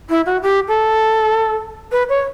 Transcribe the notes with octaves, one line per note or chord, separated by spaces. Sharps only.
E4
F#4
G4
A4
B4
C#5